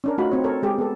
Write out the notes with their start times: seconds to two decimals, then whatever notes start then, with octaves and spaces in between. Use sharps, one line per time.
0.04 C#4 D4 A#4
0.18 A3 D#4 F4 F#4 B5
0.32 C4 C#5
0.44 A4 A#4 C#5
0.63 G#3 G4 G#4
0.78 B3 A4